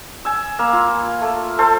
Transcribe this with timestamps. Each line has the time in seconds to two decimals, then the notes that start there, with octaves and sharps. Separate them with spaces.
0.25 G#5 E6
0.59 A#3 F5 B5 E6
0.73 F4
1.21 A3
1.59 A4 C5 A5 C#6